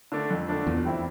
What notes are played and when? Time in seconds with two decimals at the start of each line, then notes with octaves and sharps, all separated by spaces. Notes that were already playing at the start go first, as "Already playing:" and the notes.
0.12 D3 A3 D4
0.30 F2
0.49 D3 A3 D4
0.67 E2 A#2
0.85 G3 C4 E4